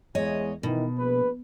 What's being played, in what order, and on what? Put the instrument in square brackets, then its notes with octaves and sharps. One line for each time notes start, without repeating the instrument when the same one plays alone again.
[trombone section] E2 G#3 [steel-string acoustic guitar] C#5 D#5
[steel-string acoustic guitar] B2 [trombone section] D#3 E3 D#4
[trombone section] A#1 B4